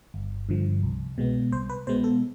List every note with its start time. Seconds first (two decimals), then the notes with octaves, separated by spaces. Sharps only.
0.14 G1
0.49 G2 D3 F3
0.83 C2
1.18 B2 G#3 B3
1.52 C2 C5
1.70 B4
1.87 B2 G#3 B3 C5
2.04 A4